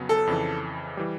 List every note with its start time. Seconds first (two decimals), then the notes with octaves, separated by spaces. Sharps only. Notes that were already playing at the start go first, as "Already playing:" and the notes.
Already playing: F2 C#3 F#3 B3
0.09 A4
0.27 F2 C#3 E3
0.97 E3 G3